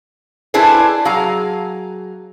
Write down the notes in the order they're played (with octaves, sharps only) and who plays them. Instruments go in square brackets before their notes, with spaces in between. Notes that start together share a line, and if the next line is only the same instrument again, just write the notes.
[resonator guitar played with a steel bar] D4 E4 G#4 A4 B4 C5
F#3 G#4 F5 A#5